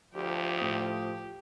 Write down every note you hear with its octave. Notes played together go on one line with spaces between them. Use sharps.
D2 F3 G4
A2 D#6